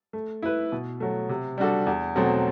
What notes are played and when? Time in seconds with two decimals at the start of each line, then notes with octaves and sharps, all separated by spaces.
0.13 A3
0.42 E4 B4
0.72 B2
1.00 F#3 A3
1.29 C3
1.58 G3 D4 F#4 A4
1.87 E2
2.16 B2 F#3 A3 C4